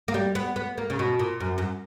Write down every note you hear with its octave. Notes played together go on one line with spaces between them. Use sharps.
A#3
G3
B3
B3
A#3
C#3
B2
A#2
F#2
F#2